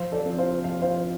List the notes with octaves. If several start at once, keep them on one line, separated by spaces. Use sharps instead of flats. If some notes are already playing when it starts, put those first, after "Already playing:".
Already playing: F3 C5 F5
A4 D5
C4 F4
C5 F5
F3 F5
C5 F5